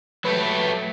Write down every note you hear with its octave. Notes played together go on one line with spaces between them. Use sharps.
F#3 A3 G4 B4